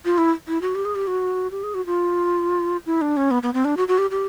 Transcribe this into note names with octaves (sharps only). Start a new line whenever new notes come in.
F4
E4
E4
F#4
G4
G#4
G4
F#4
G4
G#4
F#4
F4
E4
D4
C#4
B3
B3
C4
D4
F#4
F#4
G4
G4